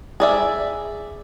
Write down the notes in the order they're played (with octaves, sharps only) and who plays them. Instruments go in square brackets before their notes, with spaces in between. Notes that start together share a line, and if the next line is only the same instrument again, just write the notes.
[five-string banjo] G#4 D5 E5